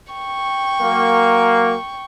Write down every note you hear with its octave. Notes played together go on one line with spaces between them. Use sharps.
G5 C#6
F#3 A#3